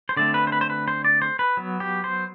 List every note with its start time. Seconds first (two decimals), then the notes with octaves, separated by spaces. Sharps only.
0.09 C5
0.17 D3 A3 C4 D5
0.34 B4
0.47 C5
0.52 B4
0.61 C5
0.70 B4
0.88 C5
1.04 D5
1.22 C5
1.39 B4
1.57 F#3 B3
1.80 G4
2.04 C5